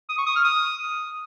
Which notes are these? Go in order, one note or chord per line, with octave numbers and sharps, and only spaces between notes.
D#6
C#6
D#6
F6
D#6